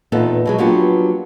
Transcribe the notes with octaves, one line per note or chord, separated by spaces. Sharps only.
E2 A#2 B3 D#4 A4
B2 F#3 G#3
F3 F#3 A#3 B3 D4 G4